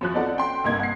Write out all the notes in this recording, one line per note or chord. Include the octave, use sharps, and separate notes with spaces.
F#2 F3 F#6
B3 C4 D#4 A4 D5 F#5
C#4 G5 C6
G1 C2 G2 A#3 D#4 G#6
F#5 C7